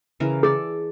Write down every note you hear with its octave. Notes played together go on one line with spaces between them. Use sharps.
C#3 E3 A#4
G#4 A4 D5